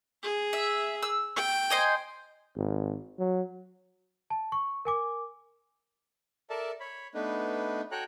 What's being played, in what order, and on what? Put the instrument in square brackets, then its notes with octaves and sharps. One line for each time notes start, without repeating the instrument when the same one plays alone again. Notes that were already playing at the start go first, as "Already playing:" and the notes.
[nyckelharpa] G#4
[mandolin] E5
E6
[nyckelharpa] G5
[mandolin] C5 D#5 G#5
[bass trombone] G#1
F#3
[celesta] A5
C#6
A#4 G#5 D6
[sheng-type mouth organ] A4 A#4 D5 E5 A5
C#5 B5
A3 B3 D4 D#4 B4
F#4 A4 C#5 G5 A#5 F#6